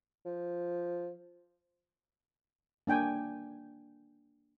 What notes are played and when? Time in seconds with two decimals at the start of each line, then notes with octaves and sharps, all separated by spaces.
0.25 F3
2.87 A#3 D4 G5 G#5